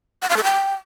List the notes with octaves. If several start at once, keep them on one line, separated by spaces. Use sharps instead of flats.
F#5
F5
A4
G5